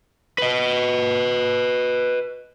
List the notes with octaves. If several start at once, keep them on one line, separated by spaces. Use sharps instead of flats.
B4 D#5